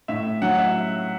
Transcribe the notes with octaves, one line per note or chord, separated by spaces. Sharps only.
A2 E5
F#3 F#5
E5